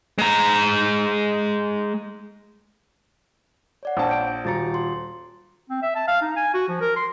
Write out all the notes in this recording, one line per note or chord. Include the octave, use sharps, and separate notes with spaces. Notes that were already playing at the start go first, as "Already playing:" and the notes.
G#3 A#5
C#5 D5 F#5
A#1 C#5 F5 A5
G6 D7
D#1 F#4 A#5 A6 C#7
C6
C4
E5
A5
F5
D#4
G#5
F#4
F3
A#4
C6